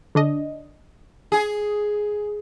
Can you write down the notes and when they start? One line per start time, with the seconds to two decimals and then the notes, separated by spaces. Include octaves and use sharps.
0.15 D3 D4 D#5
1.32 G#4